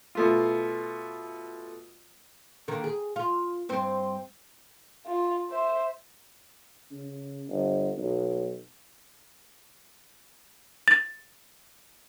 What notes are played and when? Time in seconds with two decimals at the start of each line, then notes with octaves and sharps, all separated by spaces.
0.15 B2 A3 F4
2.68 D3 D#3 A#3
2.84 G#4
3.16 F4
3.69 G2 C4 C5
5.07 F4
5.50 C5 E5
6.92 C#3
7.49 G1
7.98 B1
10.88 A6